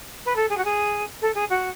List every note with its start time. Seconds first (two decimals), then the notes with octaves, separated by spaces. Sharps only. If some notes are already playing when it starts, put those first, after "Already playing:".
0.25 B4
0.35 A4
0.49 G#4
0.57 F#4
0.64 G#4
1.21 A4
1.34 G#4
1.49 F#4